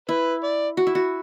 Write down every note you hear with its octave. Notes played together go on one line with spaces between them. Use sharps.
E4 B4
D5
F#4
E4
F#4